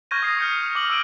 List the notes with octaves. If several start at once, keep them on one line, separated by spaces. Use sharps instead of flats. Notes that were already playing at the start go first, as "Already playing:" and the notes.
C#6 F6 G6 G#6 A#6 D#7
D#6 A#6 C7
F6 G6 C#7
D#6 F7
D6 F6 F#7
E6 F6 D7 D#7 F#7